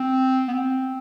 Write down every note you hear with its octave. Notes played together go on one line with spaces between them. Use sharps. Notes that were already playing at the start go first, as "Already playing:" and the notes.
Already playing: C4
B3
C4